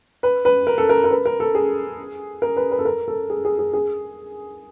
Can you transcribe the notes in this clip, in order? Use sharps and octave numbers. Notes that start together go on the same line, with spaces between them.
B4
B4
A#4
A4
A#4
A#4
B4
A#4
A4
G#4
A#4
B4
B4
A4
A#4
A4
G#4
G#4
G#4
G#4